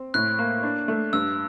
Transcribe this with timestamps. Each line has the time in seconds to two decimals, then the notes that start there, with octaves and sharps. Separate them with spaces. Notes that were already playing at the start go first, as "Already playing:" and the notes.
Already playing: C4
0.14 A2 F#6
0.39 A#3
0.63 D4
0.88 A3
1.13 G2 E6